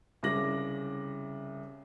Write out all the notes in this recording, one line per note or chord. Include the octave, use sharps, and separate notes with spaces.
C2 C#3 D6 A#6 F#7